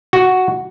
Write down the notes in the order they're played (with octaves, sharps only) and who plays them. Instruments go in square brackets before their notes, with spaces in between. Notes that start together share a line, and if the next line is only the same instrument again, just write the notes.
[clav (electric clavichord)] F#4